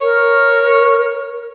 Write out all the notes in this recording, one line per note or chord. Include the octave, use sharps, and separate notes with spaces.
A#4 C#5